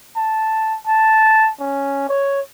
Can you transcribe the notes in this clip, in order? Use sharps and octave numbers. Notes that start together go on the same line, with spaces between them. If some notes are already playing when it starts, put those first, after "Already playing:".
A5
A5
C#4
C#5